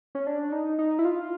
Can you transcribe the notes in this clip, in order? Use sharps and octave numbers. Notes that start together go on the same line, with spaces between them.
C#4
D4
D#4
D#4
E4
F4